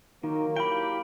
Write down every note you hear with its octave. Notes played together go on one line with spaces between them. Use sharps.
D#3 F#3 A#3 D#4
E4 G4 F5 G5 B5 D7